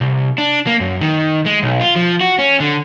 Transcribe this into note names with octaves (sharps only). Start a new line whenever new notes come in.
C2
D4
A#3
F#2
D#3
G#3
B1
F4
F3
F#4
C#4
D3